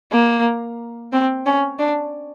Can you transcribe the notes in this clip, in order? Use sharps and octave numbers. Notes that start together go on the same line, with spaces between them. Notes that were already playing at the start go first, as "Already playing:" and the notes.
A#3
C4
C#4
D4